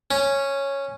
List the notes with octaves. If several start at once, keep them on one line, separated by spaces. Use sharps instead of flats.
C#4